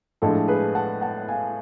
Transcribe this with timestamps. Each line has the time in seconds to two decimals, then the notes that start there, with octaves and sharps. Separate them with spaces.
0.22 A2 F3 G#3 D4 A4
0.48 G#4 B4
0.75 F#5 A5
1.01 F#5 A5
1.29 F5 G#5